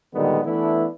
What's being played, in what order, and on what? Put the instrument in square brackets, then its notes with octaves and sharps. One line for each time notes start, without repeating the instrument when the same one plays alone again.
[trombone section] A#2 D3 D#3 G3 G#3 B3
E3 A3 B3 D4 E4